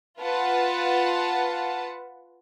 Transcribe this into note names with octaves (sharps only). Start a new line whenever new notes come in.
F4 B4 F#5 A5